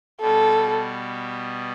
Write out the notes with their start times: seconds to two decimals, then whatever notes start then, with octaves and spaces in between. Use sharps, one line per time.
0.21 B2 G3 B3 A4